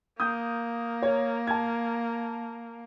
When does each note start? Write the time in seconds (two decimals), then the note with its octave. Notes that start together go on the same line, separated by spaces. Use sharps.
0.20 A#3 D#6 G6
1.02 C#5
1.47 A5 G#6